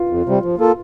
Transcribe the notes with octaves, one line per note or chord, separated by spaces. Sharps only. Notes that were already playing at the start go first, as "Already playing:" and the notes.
Already playing: F4
F2
C3 G3
F3
A#3 F4 A4